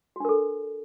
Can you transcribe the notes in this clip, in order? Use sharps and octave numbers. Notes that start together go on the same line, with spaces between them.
D4 F#4 A4 A#4